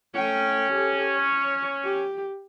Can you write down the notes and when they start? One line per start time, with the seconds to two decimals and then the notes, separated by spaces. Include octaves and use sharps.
0.15 A3 C#4 G5
0.72 G4 A4
1.16 C#5
1.84 G4